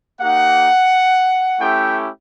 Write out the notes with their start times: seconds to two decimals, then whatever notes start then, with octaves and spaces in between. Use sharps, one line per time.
0.21 A#3 D#4 G4 F#5
1.60 A3 C#4 E4 G4 G5